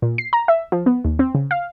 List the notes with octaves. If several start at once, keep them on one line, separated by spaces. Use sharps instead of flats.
A#2
C7
A#5
E5
F3
B3
D#2
C4
C#3
F5